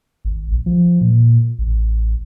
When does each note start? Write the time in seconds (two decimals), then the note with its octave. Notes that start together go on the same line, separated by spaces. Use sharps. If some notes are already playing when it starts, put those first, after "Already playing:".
0.25 G#1
0.51 A#1
0.66 F3
1.01 A#2
1.59 A1